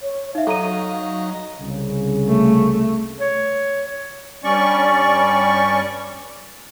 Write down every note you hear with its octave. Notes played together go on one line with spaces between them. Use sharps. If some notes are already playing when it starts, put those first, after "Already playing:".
C#5
D#4 E5 F5
F#3 D#4 A4 A#5 D#7
C2 C#3
A3
C#5
G2 G3 C#4 D5 C#6